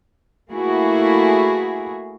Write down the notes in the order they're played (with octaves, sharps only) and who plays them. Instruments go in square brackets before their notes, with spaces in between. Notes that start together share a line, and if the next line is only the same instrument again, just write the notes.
[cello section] A3 A#3 E4 F#4 G#4